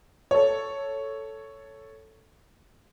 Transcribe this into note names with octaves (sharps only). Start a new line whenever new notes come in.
A4 C#5